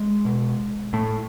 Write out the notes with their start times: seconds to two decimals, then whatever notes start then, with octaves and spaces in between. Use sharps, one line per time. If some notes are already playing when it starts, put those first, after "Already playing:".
Already playing: G#3
0.25 B2
0.93 A2 A3